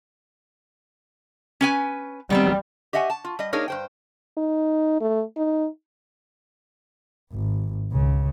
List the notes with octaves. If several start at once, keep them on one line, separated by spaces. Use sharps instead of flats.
C#4 B4 G#5
D#3 G3 B3 C4
G4 D#5 E5 F#5 G#5
A5
F4
G3 D#5
A#3 D4 D#4 G#4 A#4 C#5
G2 C5 G5
D#4
A3
D#4
G#1
C#2 C#3